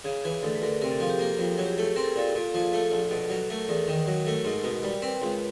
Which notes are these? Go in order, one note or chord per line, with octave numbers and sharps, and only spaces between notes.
C#3 G#4
E3 G#4
D2 A4
B4
D2 A#4
C3 A#4
A4
F3 G#4
G4
A#3
F2
F#3 G#4
G4
G#4
A3
C4 A#4
A4
G#4
A#2 A4
A#2
F3
G#4
A3 A4
A#1
B2 A4
F#3
A3 A#4
E2 A#4
D#3
F#3
A3 A#4
G#2
B2
G3
C4 B4
C#2